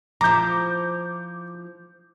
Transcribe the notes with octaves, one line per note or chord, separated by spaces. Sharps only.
F3 E4 A#5 D6 G6